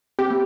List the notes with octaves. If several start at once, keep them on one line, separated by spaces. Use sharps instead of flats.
C4 G4
A#3